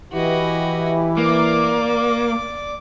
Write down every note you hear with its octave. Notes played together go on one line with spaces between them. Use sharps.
E3 E4 F#4 G4 D#5
A#3 D5 D6